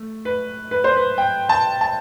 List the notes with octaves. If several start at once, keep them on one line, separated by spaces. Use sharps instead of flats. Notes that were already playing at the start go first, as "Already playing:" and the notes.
Already playing: A3
B4
B4
C5
B4
G5
A5
A5